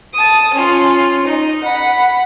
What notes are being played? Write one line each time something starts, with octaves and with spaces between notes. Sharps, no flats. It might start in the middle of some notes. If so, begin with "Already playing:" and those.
A5 D#6
C#4 F4
D#4
F#5 B5